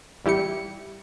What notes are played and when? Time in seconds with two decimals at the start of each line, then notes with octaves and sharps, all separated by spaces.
0.25 A1 G3 E4 G4 C#7